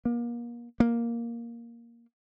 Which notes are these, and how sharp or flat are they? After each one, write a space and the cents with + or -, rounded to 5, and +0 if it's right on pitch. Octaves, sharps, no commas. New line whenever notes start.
A#3 +35
A#3 +5